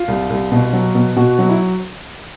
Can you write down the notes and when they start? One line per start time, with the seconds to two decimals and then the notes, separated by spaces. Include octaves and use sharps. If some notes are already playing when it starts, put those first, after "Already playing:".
Already playing: F4
0.08 C2
0.30 C2
0.52 B2
0.73 F#3
0.95 B2
1.16 B2 F#4
1.39 F#3
1.49 E4